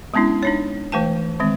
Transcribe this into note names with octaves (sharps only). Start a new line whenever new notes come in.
G#3 B3 C#4 D4 E4
D4 D#4 C#5
E3 A3 B4 G5 A5
D#3 G#3 C4